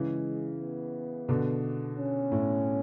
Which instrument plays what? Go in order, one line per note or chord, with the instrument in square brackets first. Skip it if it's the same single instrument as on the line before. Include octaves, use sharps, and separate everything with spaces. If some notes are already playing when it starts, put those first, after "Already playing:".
Already playing: [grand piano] C#3 E3 [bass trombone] G#3
[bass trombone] B3
[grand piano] B2 D3
[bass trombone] C#4
[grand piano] A2